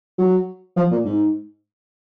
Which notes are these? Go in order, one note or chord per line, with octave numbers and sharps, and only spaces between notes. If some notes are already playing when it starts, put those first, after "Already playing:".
F#3
F3
A#2
G#2